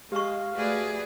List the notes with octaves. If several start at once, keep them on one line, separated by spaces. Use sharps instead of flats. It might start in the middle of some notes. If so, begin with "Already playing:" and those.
G#3 G4 F5 C#6
A3 F#4 G#4 B4 D5